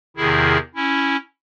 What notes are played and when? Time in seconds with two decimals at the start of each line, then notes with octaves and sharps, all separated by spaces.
0.17 E2 C3 D#3 E4 G#4
0.75 C#4 E4